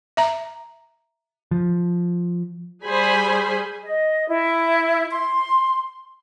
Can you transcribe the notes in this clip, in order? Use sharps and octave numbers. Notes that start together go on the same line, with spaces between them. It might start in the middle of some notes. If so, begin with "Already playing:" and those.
E5 A#5
F3
G3 G#4 C5 G#5 B5
D#5
E4
C6